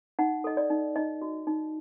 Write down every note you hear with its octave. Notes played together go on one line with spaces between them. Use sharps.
D#4 F#5
A4 D#5
D5
D#4
D#4 D#5
F#4
D#4